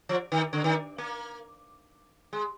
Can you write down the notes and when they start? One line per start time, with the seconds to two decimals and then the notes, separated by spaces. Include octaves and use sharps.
0.09 F3
0.32 D#3
0.53 D3
0.64 D#3
0.98 A#3
2.33 G#3